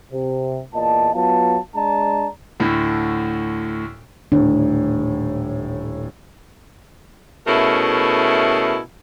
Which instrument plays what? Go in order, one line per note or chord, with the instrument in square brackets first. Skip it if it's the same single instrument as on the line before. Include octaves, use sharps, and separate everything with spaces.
[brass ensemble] C3
E2 A#2 D#5 A5
F#3 B3 F4 F5 A5
G#3 D4 D5 A5 A#5
[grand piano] D2 A2 D3
[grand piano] D#1 A2 [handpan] D4
[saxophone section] B2 A3 C#4 E4 G#4 A#4